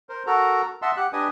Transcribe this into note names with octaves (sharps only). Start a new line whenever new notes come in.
A#4 C5
F#4 A4 A#4 A#5
D#5 E5 F#5 A5 C6 E6
G4 F#5 F#6
D4 G4 B4 D#5 G#5 D#6